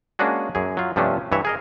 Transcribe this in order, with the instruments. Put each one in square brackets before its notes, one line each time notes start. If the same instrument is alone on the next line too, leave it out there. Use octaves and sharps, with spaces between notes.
[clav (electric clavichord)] G#3 A#3 C#4 D4 F#4 G#4
F#2 G#4
F#3 F4
G2 C3 F3 A3 C#4 D4
G2 E3 C#5 E5
G#4 A#4 D#5